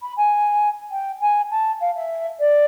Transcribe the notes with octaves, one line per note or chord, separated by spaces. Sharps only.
B5
G#5
G5
G#5
A5
F5
E5
D5